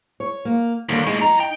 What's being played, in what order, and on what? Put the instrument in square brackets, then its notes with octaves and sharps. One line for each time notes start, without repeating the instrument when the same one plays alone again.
[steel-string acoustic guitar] C#5
A#3
[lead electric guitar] D#2 [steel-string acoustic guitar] D3 G3 A#3
[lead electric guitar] G#3 A3 [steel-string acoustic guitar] D#4
[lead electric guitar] F2 A#5 [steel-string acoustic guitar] D#4
[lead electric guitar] G5